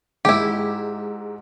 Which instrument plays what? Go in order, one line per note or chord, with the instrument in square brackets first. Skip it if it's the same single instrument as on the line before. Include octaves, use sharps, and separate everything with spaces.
[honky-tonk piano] G#2 [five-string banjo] E4 G4